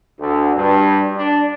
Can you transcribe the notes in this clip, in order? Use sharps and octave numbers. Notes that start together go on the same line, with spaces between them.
D2
G2
D4